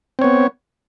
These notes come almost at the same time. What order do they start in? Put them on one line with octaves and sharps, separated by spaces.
C4 C#5 B3